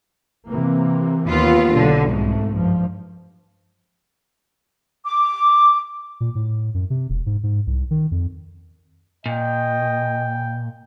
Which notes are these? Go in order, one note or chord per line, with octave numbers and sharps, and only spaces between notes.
C3 E3 A#3
D#2 B3 F4
B1 D3
C2 G#2 A3
G2 F3
D6
A#2
A2
F#2
C3
E1
G#2
G#2
C2
D#3
F2
A#2 D#5 G5